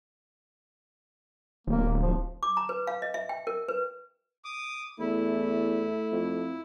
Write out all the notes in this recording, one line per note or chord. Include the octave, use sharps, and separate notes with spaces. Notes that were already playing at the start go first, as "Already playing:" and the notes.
D1 A#3
F3
D6
A#5
B4
F5
D#5
E5
G5
A#4
B4
D6 D#6
E2 A3 E4
F2